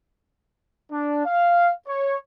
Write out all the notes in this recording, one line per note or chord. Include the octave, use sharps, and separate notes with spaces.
D4
F5
C#5